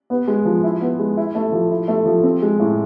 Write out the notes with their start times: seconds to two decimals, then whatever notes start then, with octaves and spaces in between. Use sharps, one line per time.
0.10 B3
0.27 G#3
0.45 F3
0.63 E4
0.81 B3
0.99 G#3
1.17 E4
1.35 A3
1.52 F3
1.70 E4
1.88 A3
2.06 F3
2.23 C4
2.42 G#3
2.60 A2